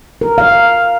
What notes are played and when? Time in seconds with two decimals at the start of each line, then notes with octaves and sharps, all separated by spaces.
0.21 A#4
0.38 F5